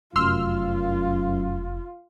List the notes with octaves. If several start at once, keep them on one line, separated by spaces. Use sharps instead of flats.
F1 F#2 F4 C6 E6 F6